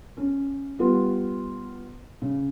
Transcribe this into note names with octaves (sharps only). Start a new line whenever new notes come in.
C#4
G3 B3 F4
C#3